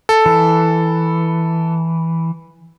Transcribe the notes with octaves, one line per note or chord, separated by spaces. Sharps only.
A4
E3